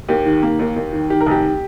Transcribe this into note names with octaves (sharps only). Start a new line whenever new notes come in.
D#2 G4
D#3
A#3
D#2
D#2
D#3
D#3 G4
A#4
F1 G4